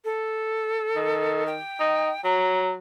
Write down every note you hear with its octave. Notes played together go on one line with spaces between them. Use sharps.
A4
D#3
G5
D#4
F#3 A#5